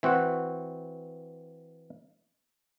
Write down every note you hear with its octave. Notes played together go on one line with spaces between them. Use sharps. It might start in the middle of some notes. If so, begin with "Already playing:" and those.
E3 C4 F#4 F#5